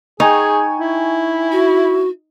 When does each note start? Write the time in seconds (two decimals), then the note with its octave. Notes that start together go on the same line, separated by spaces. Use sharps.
0.20 D#4 G#4 G5 G#5 C#6
0.80 E4
1.52 F#4